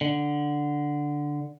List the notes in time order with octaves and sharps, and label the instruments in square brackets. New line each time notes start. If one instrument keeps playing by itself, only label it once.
[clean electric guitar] D3